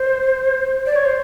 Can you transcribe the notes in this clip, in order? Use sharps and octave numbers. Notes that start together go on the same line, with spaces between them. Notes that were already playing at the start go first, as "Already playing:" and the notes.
Already playing: C5
D5
C#5
C5